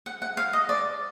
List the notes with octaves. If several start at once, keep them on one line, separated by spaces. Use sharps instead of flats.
F#5
F#5
F5
D#5
D5